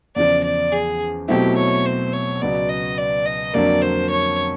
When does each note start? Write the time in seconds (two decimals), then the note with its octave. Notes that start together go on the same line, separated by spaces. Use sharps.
0.16 E2 C#3 F3 D5
0.44 D5
0.72 G#4
1.28 B2 F#3 A3 C4 E4 G4
1.57 C#5
1.85 C5
2.13 C#5
2.41 C#2 B2 F#3 B3 D5
2.69 D#5
2.98 D5
3.25 D#5
3.54 F2 D3 F#3 A#3 D5
3.82 C5
4.10 C#5